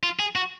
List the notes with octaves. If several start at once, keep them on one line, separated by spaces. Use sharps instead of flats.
F4
G#4
F#4